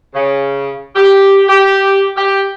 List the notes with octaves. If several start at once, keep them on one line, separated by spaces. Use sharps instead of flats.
C#3
G4
G4
G4